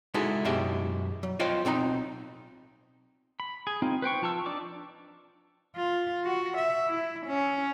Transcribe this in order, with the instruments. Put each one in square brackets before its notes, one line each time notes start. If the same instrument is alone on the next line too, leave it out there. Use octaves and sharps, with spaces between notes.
[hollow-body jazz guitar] G#3 D#4 E4 F#4 A4
F#2 B2 G#3 E4 G4 E5
F#3
F4 C5 C#5 D#5 G5
B1 C4 D#4 A#5
[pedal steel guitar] B5
G#4
C4 D#4 F4
B4 C5 G5 C#6
F3 F4 A5 C#6 E6
D4 D#4 D5 A5 D6
[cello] F4
F#4
E5
E4
C#4